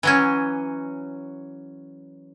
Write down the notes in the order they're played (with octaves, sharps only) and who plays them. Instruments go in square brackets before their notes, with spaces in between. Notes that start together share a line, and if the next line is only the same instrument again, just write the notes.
[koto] E3 F#3 C#4